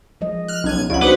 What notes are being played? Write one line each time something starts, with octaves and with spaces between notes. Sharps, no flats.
F3 G#3 D#5
F6 F#6
B1 C#4 G#6 D#7
C#2 D5 F#5
A#3 D4 D#4 F#4 B4 C5 F#5